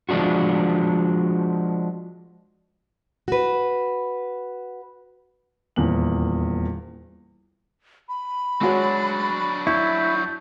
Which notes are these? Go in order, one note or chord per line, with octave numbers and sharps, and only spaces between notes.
F3 G#3 D4 F4 F#4
F#4 B4
D#1 E2 A#3 F#7
B5
F#3 G#3 D4 F#4 C#5
E4 C#6 G6